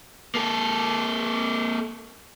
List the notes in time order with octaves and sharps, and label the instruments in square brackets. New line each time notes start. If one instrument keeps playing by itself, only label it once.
[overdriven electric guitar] A#3 A4